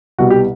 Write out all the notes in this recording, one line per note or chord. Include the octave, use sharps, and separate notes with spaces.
C2 B2 G3 F#4
G4